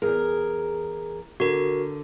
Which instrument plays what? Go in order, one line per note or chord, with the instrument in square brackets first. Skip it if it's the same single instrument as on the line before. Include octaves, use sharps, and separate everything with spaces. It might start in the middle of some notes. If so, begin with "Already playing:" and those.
[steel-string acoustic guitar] E2 G#4 A#4
[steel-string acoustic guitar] D3 [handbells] F#4 A#4